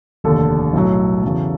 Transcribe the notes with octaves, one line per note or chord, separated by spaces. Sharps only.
F1 D#2 D3 A4
B1 A2 F#3
E2 C#3 F#3